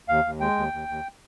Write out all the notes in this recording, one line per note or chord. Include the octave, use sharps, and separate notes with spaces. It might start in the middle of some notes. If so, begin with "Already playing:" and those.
D#2 F5
D#2
G#3 G5
D#2
D#2
D#2